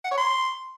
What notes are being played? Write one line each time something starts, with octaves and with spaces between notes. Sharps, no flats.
F#5
C#5
C6